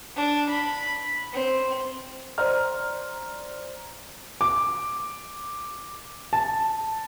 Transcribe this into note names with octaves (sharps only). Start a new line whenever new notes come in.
D4
B5
C4
C5 D5 A#5 F6
D6
A5